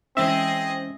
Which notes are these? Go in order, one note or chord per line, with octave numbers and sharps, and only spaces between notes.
E3 G#3 C4 C#4 G#4 D#5 E5